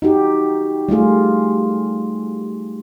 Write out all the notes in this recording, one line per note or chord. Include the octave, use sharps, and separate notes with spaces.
D#4 F#4 G4
G3 A3 F4 G#4